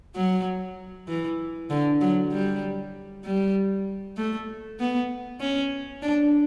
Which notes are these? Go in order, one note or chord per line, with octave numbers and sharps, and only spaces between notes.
F#3
E3
D3
F#3
G3
G3
A3
B3
C#4
D4